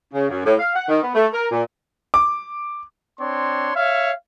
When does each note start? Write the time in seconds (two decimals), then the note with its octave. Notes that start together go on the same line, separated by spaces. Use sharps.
0.13 C#3
0.29 F#2
0.45 A2
0.59 F5
0.74 F#5
0.88 D#3
1.02 B3
1.15 A3
1.33 A#4
1.51 A#2
2.14 D6
3.20 C4 D4 C#5 C6
3.76 C#5 E5 F5